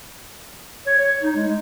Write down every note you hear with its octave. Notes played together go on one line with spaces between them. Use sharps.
C#5
C#5
D#4
G#3
G#3